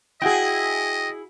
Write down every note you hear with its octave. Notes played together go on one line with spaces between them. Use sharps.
E4 F#4 G#4 D#5 F#5 G5 A#6